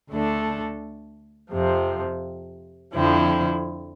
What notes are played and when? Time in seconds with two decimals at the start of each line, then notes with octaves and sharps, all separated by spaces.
0.11 D2 D3 A3 D4 A4
1.52 F2 C3 F3
2.94 F2 D3 F3 C4 E4